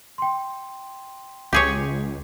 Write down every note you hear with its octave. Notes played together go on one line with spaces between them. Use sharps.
G5 C6
C#2 G4 G#4 C#5